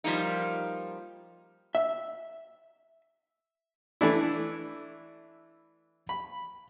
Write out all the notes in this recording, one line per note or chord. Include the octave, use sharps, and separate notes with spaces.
F3 G3 A#3 D#4
E5
E3 A3 D4 E4
B5